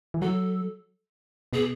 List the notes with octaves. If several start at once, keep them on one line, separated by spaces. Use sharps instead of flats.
E3
F#3 A4
B2 G#4